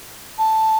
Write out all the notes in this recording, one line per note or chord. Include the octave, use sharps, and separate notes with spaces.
A5